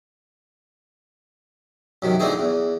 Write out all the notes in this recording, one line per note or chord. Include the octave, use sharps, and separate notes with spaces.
F#2 C3 D#3
D3 E3 A3 C4 D#4 G#4
E2